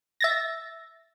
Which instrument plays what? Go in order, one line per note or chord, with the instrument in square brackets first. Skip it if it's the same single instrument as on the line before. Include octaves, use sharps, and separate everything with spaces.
[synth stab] E5 A6 A#6